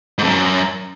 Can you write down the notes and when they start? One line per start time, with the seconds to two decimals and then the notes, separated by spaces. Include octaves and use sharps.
0.18 G#2
0.24 F2
0.29 F#2